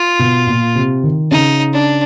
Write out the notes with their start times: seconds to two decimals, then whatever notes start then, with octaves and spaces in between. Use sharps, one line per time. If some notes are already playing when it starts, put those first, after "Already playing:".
Already playing: F4
0.19 B2
0.47 A#2
0.75 C3
1.03 D#3
1.31 C#3 D#4
1.73 D4